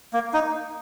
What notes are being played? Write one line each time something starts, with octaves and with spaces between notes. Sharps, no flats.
A#3
D#4